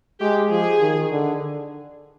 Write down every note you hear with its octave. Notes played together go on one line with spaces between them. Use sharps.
G#3 G4
F3 G#4
D#3
D3